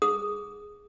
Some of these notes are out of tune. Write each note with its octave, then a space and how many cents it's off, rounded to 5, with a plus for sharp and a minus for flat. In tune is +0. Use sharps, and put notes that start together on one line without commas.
G#4 +0 D#6 -5